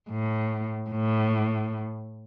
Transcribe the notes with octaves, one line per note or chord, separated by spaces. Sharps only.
A2
A2